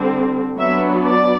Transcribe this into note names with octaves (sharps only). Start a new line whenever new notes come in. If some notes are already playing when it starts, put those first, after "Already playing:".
Already playing: D3 G3 C4
F#3 B3 D4 E5
D5